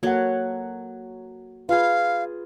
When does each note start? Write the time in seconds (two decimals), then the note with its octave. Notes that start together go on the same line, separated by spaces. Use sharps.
0.03 F#3 A#3 A4 C#5 F#5
1.69 F4 G#4 B4 F5